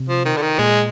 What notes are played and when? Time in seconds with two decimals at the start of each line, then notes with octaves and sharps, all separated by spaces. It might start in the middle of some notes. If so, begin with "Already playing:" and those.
Already playing: C3
0.09 F3
0.25 D#3
0.37 D3
0.42 D#3
0.58 A#2 G#3